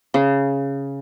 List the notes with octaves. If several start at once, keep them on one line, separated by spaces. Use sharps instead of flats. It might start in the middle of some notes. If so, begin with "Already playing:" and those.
C#3